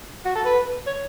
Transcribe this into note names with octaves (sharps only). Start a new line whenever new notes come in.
F#4
A4
B4
C#5